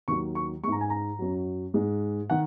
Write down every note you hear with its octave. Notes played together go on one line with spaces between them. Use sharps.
D#2 D#3 F#3 C#6
C#6
G#2 G#3 A#5 C#6
G#5
A#5
F#2 F#3
G#2 G#3
D#3 F#5